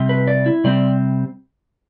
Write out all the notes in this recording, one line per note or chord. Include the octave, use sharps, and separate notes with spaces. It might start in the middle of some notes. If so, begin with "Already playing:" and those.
Already playing: C3 G3 C4
B4
D5
E4
C3 G3 C4 D5